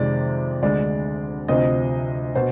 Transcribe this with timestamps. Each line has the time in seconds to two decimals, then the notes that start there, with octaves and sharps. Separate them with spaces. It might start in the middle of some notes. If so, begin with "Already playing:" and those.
Already playing: F2 C3 D#3 G#3 C4 D5
0.62 D2 D3 G#3 D5
1.48 D2 C3 F3 C4 D#5
2.35 B2 C5